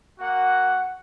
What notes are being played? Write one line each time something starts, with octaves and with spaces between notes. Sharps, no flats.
A#3 F#4 F#5